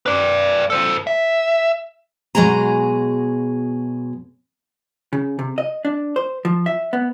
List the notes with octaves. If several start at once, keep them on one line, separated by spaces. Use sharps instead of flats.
B4 D5
A4 C5
E5
B2 F#3 G#3 G#4 A#5
C#3
C3
D#5
D4
C5
F3
E5
B3